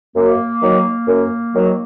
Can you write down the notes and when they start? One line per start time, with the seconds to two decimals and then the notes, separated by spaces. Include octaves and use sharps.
0.15 F#2 A#3
0.61 D#3 F#3
1.07 F#2
1.53 D#3 F#3